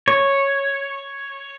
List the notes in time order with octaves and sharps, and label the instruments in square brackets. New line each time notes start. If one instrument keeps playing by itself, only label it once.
[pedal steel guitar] C#5